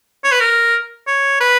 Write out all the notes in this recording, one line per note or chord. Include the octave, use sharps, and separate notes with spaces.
C#5
B4
A#4
C#5
B4